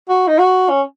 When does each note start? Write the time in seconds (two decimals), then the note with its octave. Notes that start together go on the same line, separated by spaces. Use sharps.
0.09 F#4
0.28 D#4
0.39 F#4
0.70 C#4